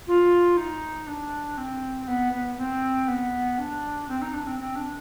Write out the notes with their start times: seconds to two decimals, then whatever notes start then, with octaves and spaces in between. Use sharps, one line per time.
0.07 F4
0.57 D#4
1.07 D4
1.57 C4
2.07 B3
2.32 B3
2.57 C4
3.08 B3
3.58 D4
4.08 C4
4.22 D#4
4.33 D4
4.46 C4
4.59 C4
4.75 D4